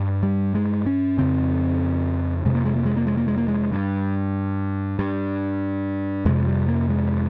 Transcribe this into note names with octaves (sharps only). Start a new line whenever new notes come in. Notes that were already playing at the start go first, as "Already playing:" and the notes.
Already playing: G2
G3
G#3
C#4
F2 C#3 C4
F2 C3 G#3
A#3
G#3
A#3
G#3
A#3
G#3
A#3
G#3
A#3
G#3
G2
G2
F2 C3 G#3
G3
A#3
G#3